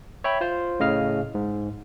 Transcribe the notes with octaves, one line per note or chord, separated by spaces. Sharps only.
C#5 E5 G5 B5
F4 C5
A2 C#3 D#5 F5 F6
G#2